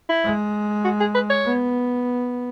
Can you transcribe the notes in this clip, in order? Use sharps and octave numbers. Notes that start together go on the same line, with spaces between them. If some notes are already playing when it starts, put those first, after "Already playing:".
E4
G#3
F#4
G#4
B4
C#5
B3